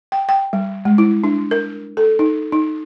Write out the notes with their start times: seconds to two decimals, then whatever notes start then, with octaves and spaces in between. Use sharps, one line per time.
0.12 G5
0.29 G5
0.53 G3
0.85 G#3
0.98 E4
1.24 D4
1.51 A#4
1.97 A4
2.19 D#4
2.52 D#4